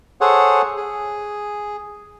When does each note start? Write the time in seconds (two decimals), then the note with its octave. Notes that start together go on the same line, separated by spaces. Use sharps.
0.21 G#4 A4 C5 C#5 F#5
0.77 G#4